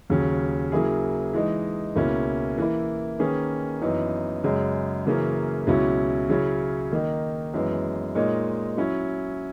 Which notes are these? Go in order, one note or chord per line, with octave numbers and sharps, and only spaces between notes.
D#2 C#3 F#3 C#4
C#3 F#3 A#3 E4 G#4
E3 G#3 D#4
C#2 B2 A#3 C#4 E4
E3 A#3 E4
D#3 A#3 C#4 G#4 B4
F#2 E3 B3 D#4
F#2 C#3 G#3
F#2 C#3 E3 A#3 C#4
C#2 B2 F#3 C#4 E4
C#3 F#3 C#4 E4
D#3 A#3 D#4
F#2 E3 G#3 B3
A#2 G#3 D#4 A#4 C#5
F#3 C#4 E4